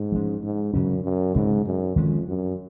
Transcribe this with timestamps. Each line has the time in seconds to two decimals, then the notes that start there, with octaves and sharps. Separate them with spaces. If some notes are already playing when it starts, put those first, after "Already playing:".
Already playing: G#2
0.12 F3 G#3 C#4
0.42 G#2
0.74 F#2 C#3 F#3 C#4
1.04 F#2
1.35 G#2 C#3 G#3 C4
1.66 F#2
1.96 F2 D#3 G#3 C#4
2.27 F#2